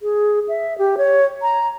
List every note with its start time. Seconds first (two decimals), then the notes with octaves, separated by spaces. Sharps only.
0.02 G#4
0.48 E5
0.78 G4
0.98 C#5
1.42 A#5